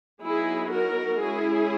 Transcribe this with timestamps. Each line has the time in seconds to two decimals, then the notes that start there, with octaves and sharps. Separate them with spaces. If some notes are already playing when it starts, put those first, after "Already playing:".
0.23 F#3 B3 D#4 E4 G#4
0.72 F#4 A#4
1.20 G#3 C#4 E4 G#4